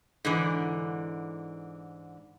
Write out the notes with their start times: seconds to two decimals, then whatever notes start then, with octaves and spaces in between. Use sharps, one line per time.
0.25 G#2 D3 E3